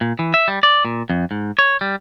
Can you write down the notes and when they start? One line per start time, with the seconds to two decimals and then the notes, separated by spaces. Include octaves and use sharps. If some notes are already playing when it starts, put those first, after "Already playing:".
0.01 A#2
0.19 E3
0.34 E5
0.48 G3
0.63 D5
0.85 A#2
1.10 F2
1.31 G#2
1.59 C#5
1.81 G3